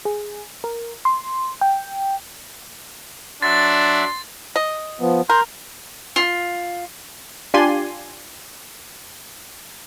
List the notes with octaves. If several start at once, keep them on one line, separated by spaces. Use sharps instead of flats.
G#4
A#4
C6
G5
F#3 D4 E5 C6 A6
D#5
F3 B3
A#4 C6 G6
F4
D4 F4 G4 D5 G#5 C6